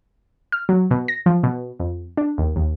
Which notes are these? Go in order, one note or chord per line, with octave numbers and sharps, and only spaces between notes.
F6
F#3
B2
A#6
F3
B2
F2
D4
D#2
D#2